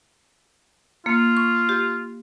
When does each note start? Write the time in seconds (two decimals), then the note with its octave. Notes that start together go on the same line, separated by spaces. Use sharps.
1.06 A#3 F4
1.37 C#6
1.69 G4